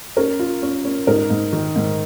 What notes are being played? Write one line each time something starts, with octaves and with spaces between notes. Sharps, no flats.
C#4 A#4
F4
C#4
C#4
G#2 A#4
G#2
D#3
G#2